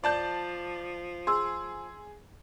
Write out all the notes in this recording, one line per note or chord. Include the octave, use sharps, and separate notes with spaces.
F3 D5 A5 G6
G#4 C6 E6